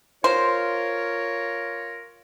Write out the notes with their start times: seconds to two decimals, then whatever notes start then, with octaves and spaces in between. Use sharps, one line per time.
0.24 F4 A#4 C5 C#5